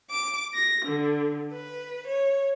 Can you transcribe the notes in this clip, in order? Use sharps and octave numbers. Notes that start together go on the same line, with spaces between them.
D6
A#6
D3
B4
C#5